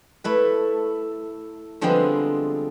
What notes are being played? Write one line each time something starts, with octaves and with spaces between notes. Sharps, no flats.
A3 E4 B4
D3 F3 G3 G#3 B3 C4